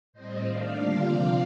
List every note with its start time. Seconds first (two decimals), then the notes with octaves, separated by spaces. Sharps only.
0.13 A2 G3 C4 C5 D#5
0.43 D#3 A3 D4 D5 F5
0.74 D3 G3 A#3 D4 F4
1.04 C3 F3 C4 F4